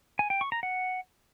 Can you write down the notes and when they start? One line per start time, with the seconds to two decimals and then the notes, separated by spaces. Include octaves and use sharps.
0.19 G#5
0.30 G5
0.41 C#6
0.52 A#5
0.63 F#5